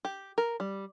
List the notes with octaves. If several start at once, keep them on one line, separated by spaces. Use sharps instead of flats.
G4
A#4
G3